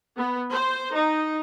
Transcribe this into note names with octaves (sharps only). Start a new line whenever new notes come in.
B3
C5
D#4